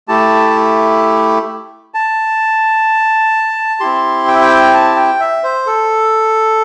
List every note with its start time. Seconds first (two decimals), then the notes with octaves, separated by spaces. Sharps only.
0.08 A3 E4 G4 A5
1.94 A5
3.80 C4 E4 G4 C6
4.28 G5
4.35 E5
4.41 G5
4.74 A5
4.96 G5
5.20 E5
5.43 C5
5.66 A4